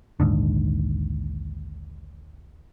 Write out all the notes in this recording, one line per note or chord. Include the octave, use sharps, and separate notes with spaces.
A#1 D#2 G#2 D3